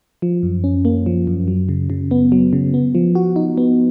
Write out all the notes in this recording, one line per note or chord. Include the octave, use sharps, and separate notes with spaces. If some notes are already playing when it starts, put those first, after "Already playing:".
F3
F#2
C#4
A#3
F3
F#2
F#3
C#3
C#3
B3
F#3
C#3
B3
F3
F#4
D#4
B3